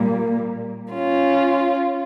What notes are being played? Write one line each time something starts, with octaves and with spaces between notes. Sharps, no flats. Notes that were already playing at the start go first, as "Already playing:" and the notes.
Already playing: A#2 G3 A#3
C#4 F4